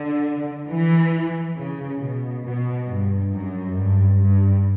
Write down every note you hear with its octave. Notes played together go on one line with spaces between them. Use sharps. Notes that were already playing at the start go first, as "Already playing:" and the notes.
Already playing: D3
E3
C#3
B2
B2
G2
F#2
G2
G2